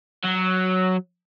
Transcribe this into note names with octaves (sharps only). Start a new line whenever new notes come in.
F#3